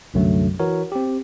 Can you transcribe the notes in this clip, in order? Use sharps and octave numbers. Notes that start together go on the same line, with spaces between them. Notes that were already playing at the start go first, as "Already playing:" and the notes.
C2 F#2 D3 F#3 A3
E3 F#4 A#4 C#5
C4 G4